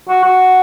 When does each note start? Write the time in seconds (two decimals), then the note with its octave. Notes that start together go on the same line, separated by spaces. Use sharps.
0.09 F#4
0.24 F#4